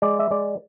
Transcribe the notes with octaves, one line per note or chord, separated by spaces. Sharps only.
G#3 D5
E5
G#3 D5